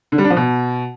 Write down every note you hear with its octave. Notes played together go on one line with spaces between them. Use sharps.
D3
G3
D4
F3
B2